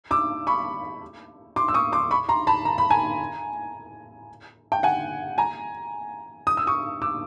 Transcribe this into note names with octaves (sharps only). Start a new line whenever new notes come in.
D6 E6
B5 C#6
C6 D6
E6
C#6 D#6
C6 D6
B5 C#6
A#5 C6
A5 B5
A#5
B5
G#5 A#5
G5
F#5 G#5
G#5 A#5
D#6
E6
C#6 D#6
D6 E6